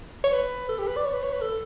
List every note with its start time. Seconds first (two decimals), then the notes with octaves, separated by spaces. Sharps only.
0.24 C#5
0.33 B4
0.69 A4
0.79 G4
0.87 B4
0.96 D5
1.05 C#5
1.14 B4
1.23 C#5
1.32 B4
1.41 A4